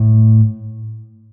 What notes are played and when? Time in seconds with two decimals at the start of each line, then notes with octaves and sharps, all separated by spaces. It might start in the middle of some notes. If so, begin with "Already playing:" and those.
Already playing: A2